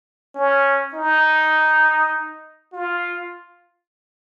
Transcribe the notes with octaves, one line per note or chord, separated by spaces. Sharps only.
C#4
D#4
F4